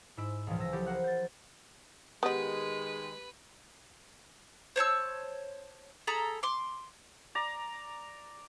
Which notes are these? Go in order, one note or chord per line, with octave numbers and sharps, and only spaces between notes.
G#2 E4 E6 D7 E7
C#2 A#2 E3 F3 G#3
E6 A#6
F3 F#3 E4 G4 A4
A#4 C5 F#5 F#6
G6 A6
D#3 G#3 B3 G4 B4 D#5
C5 C#5 A5 E6
G#4 A4 A#5 B5
C6 D6
D5 A#5